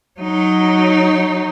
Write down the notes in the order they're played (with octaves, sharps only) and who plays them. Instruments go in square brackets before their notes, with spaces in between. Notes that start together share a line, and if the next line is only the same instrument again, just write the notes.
[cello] F#3 D#4